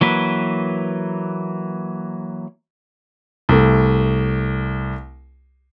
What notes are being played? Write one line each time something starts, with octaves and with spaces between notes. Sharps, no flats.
E3 F#3 A#3 B4
C2 A3